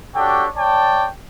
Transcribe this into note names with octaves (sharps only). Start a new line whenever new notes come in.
D4 F#4 G4 A4 C#5 G5
C#5 D5 G5 A5